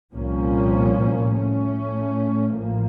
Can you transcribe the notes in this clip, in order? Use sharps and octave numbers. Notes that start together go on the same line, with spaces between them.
C2 A#2 F3 A#3 C#4
A2 A3 C#4
A1 A2 F3 A#3